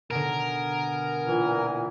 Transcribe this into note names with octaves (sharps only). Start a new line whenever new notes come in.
B2 D3 B3 A#4 G#5
A#2 E3